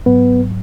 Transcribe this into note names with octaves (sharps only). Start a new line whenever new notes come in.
G#2 F#3 B3 B4